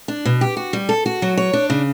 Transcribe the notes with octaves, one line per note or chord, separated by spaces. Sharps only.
D4
B2
G4
F#4
G3
A4
F#4
F#3
C#5
D4
C#3